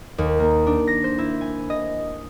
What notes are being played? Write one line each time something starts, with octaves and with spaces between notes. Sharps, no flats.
D#2
A#3
D4
A#6
C5
E4
G#5
D#5